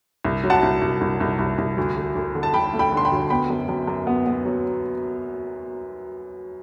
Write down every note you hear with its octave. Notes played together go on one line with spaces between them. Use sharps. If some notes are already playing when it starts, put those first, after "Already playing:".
C2
F#3
F#5 A5
C2
C2
C2
C2
C2
C2
D2
D2
D2
D3
A5
D3 G5 B5
A3
G5 B5
D3
C6
G5 B5
D2
B3 G5 B5
F#2
F#2
F#2
B3
B3
F#3